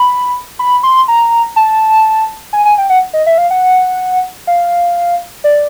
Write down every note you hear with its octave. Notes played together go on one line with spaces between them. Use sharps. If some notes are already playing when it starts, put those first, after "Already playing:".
Already playing: B5
B5
C6
A#5
A5
G#5
G#5
G5
F#5
D#5
E5
F5
F#5
F5
D5